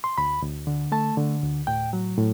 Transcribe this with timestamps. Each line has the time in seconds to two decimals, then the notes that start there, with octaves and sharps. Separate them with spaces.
0.04 C6
0.18 D2 B5
0.42 D2
0.67 D3
0.92 A3 A5
1.18 D3
1.43 D2
1.67 A2 G5
1.93 F#3
2.17 A2